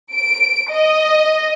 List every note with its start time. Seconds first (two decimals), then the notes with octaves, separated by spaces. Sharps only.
0.14 D7
0.71 D#5